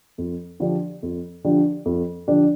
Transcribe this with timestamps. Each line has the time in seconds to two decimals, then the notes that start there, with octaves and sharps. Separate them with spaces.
0.18 F2
0.60 D3 F3 D4 G4
1.03 F2
1.44 D3 F3 D4 G4
1.85 F2
2.28 D3 F3 D4 G4